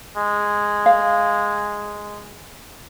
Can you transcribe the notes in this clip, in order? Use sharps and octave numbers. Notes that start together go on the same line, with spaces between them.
G#3
F5